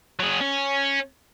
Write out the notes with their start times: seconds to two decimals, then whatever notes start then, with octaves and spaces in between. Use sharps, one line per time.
0.20 F#3 G#4
0.41 C#4